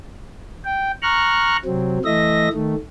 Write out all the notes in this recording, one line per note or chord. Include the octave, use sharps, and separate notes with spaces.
G5
A#5 C#6 F6 F#6
C3 F#3 C4
E3 A3 D#5 E5 A#6
D#3 A3